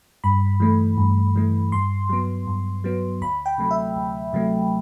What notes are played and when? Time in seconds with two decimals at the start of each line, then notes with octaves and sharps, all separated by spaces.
0.24 G2 B5
0.60 E3 A3
0.97 G2
1.36 E3 A3
1.72 G2 C6
2.09 F#3 B3
2.47 G2
2.84 F#3 B3
3.21 D2 B5
3.46 G5
3.58 C3 F#3 A3
3.71 E5
3.96 D2
4.33 C3 F#3 A3